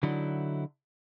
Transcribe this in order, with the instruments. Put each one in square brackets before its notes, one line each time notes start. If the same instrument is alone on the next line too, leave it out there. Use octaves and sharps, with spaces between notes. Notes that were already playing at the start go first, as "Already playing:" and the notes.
[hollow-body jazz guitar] D3 F#3 D#4 E4